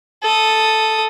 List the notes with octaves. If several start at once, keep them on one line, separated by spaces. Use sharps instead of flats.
A4 D#6